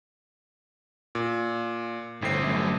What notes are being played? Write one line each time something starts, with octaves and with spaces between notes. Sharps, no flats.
A#2
G1 A2 C4 C7
F#2 A2